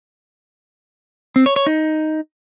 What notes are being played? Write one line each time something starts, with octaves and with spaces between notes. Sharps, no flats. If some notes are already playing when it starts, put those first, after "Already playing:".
C4
C#5
C#5
D#4